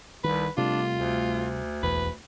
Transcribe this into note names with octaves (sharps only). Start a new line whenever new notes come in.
C2 D#3 B4
C3 G3 A3 D4 F4
D2
E1 B1 E2 B4